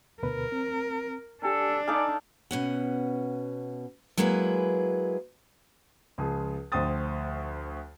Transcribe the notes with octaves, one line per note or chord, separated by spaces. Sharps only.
D2 B2 A#4 B4
C4
D4 G4 A4 G#5
D#4 A4 D5 F5 G#5
B2 C#4 F#5
F#3 G#3 A#3 E4 G#4 B4
C#2 F3 G#4
D2 F3 C5 G5 D#6 A6